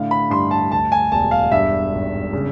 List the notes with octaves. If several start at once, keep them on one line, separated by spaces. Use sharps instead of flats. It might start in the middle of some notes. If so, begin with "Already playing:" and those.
Already playing: A2 D3 F5
B5
G2 C6
A5
D2 A5
G#5
E1 A5
F5
G2 E5
G#1
C#3